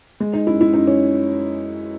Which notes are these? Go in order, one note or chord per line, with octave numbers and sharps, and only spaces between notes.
G#3
D#4
F#2 E4
E4
F#2 D#4
C#4